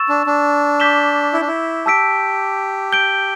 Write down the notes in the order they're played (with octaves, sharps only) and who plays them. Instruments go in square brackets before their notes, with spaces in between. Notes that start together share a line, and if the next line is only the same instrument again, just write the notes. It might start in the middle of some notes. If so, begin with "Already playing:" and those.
Already playing: [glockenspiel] C#6 E6 A6 E7
[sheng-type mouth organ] D4
D4
[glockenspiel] D6 G6 B6 E7 G7
[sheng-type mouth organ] E4
D4
E4
[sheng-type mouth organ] G4 [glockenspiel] A5 E6 B6 D7
[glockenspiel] G6 D7 G7